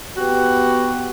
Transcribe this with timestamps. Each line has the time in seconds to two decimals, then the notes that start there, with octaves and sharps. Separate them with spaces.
0.17 B3 F#4 G4